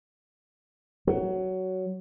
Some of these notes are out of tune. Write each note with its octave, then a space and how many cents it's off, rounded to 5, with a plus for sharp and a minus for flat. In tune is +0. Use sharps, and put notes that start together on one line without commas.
F#3 +15